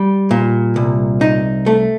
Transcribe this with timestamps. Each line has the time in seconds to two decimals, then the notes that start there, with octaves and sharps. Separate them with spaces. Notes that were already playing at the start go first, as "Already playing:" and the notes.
Already playing: G3
0.31 A#2
0.76 C2
1.21 D#4
1.66 A3